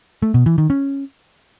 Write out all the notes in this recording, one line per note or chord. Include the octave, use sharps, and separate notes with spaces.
A3
B2
E3
D#3
C#4